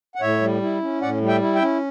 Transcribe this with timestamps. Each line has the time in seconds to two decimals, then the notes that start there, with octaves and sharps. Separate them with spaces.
0.15 F#5
0.21 A2 C#5 E5
0.41 G3
0.62 E4
0.82 C#4
1.02 A2 D5 F#5
1.22 G3
1.28 E5 G5
1.41 E4
1.55 E5 G5
1.61 C#4